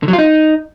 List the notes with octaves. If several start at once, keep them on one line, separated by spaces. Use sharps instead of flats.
D3
F#3
F4
D#4